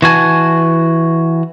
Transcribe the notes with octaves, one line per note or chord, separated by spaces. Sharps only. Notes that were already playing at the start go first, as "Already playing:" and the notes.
E3 F#4 G#5 A5